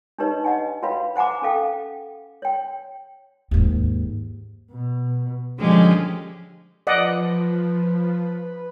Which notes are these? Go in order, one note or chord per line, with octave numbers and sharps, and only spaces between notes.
D4 D#4 G4 B4 C#5 D#5
D#5 F#5 G#5
F#4 B4 C#5 F5 G5 B5
C5 F#5 G#5 A#5 D6
C#4 A4 F5 G5
C#5 G5
D#2 G#2
B2
D3 F3 G#3 C#4 G4
F3 B4 D5 D#5 F#5